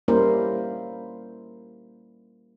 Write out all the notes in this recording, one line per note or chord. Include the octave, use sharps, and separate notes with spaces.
G3 A#3 C#4 E4 A#4 C5